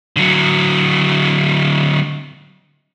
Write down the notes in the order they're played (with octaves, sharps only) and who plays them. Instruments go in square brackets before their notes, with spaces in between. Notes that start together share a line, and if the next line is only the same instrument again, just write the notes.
[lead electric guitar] D3 F#3